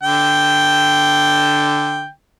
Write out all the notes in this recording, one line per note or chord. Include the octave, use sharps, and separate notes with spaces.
D3 G5